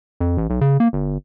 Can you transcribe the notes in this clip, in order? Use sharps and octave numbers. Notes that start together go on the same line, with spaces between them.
F2
A1
B1
C#3
A#3
G1